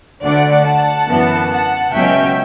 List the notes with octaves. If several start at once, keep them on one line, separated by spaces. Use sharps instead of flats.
D2 D3 A3 D4 D5 F#5
F#5 A5
F#2 E3 B3
F#5 A5
C#2 B2 F#3 C#4 E5 G5